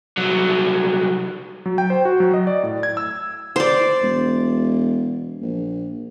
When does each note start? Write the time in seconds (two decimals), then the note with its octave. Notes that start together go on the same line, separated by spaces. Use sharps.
0.17 C2 F#3
1.66 F#3
1.78 G5
1.90 C5
2.05 F#4
2.20 F#3
2.34 D#5
2.47 D5
2.63 A2
2.83 G#6
2.97 E6
3.56 C5 D5
4.02 E1
5.41 A#1